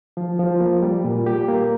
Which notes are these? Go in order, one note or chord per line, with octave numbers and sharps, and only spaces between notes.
F3
F3
A#3
G3
A#2
G4
A#3